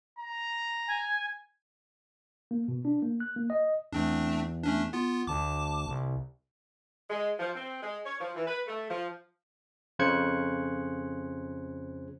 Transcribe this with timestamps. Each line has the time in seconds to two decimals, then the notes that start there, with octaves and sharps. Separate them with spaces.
0.19 A#5
0.87 G#5
2.51 A#3
2.68 B2
2.85 D4
3.02 A#3
3.20 F#6
3.36 A#3
3.50 D#5
3.93 E2 A3 C4 D4
4.63 A3 C#4 D4
4.93 B3 F4
5.27 D2 A5 D6
5.87 C2
7.09 G#3
7.39 F3
7.55 C4
7.82 G#3
8.05 C#5
8.20 F3
8.35 E3
8.47 B4
8.67 A3
8.89 F3
9.99 F2 C#3 C5 F#6 G#6 C#7